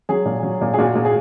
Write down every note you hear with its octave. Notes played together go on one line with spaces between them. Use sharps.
F#3 G#4
A#2
F#3
A#2
G#4
A#2 F#4
A#2
G#4